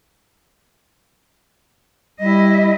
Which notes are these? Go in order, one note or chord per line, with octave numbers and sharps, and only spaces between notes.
G3 E4 D#5